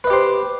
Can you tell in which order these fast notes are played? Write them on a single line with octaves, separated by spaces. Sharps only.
B4 D#5 G4 C5